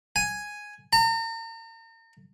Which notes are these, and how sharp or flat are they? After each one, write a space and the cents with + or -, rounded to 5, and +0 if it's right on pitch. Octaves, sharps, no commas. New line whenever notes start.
G#5 +0
A#5 -40